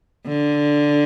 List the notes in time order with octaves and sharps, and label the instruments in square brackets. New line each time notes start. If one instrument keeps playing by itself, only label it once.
[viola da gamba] D3